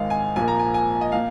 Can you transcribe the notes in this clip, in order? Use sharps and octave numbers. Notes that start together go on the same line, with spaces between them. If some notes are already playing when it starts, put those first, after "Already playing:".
Already playing: G#1 G#2 D#3 G#3 F5
G#5
A#1 A#2 F3 A#3 G#5
A#5
G#5
G#5
D#5
A#2 F5